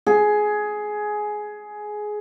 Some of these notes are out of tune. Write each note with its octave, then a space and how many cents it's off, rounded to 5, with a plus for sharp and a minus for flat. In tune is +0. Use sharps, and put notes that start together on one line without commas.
G#4 +15